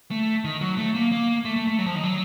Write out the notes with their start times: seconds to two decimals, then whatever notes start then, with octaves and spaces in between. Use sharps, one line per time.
0.11 A3
0.44 D#3
0.61 F#3
0.77 A3
0.95 A#3
1.12 A#3
1.45 A3
1.56 A3
1.68 A3
1.78 F#3
1.86 F3
1.95 D#3
2.03 F#3